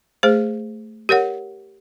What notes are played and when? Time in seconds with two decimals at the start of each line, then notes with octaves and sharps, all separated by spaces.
0.23 A3 G#4 C5
1.09 G4 A#4 C#5 F#5